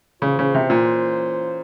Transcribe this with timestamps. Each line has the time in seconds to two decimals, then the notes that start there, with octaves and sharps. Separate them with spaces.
0.22 C#3 E3 A#3 C#4 F4 C5
0.39 C#3
0.54 C3
0.70 A#2